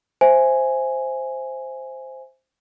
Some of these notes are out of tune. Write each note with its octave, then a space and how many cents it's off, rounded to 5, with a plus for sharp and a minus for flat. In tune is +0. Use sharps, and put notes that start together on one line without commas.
C5 +0 E5 +0 G#5 +0